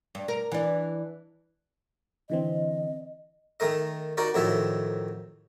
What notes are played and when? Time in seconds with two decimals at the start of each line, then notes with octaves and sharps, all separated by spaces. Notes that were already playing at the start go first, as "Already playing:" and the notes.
0.15 G2
0.28 A#4
0.52 E3 D4
2.30 D3 E3 C4 D#5
3.60 D#3 A3 A#4 D#5
4.17 D#4 F#4 A#4 D5
4.34 F2 A2 D#3 F#3 E5 A5